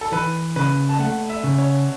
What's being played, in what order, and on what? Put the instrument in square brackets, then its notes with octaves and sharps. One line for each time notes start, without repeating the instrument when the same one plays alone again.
[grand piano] A4
[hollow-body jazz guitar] E3 [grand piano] B4
[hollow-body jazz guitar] C#3 [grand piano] B4
[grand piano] A5
[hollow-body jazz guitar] A3 [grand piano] F#5
[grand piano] E5
[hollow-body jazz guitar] C#3
[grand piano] C#5